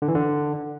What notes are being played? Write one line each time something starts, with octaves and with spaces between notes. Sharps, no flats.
D3
E3
D3